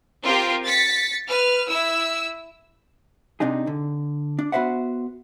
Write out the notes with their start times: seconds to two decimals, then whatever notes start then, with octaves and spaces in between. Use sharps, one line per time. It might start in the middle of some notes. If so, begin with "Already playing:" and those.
0.23 C4 F4 G4 A#4
0.65 A6 B6 C#7
1.27 B4 F6
1.68 E4 E6
3.40 C3 D4 D#4 G#4
3.67 D3
4.39 D4
4.52 B3 F#4 B4 C5 E5 F#5